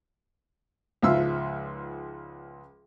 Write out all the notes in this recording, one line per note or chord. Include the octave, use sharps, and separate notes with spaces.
C#2 G#2 F3 E5 F5 E6